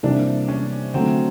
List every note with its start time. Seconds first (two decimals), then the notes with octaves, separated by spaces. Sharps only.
0.03 C3 E3 G3 A#3 D4
0.48 C#4
0.94 D3 F#3 A3 C4 D4